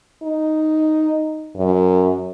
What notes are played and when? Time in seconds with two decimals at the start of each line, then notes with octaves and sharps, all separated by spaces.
0.23 D#4
1.56 F#2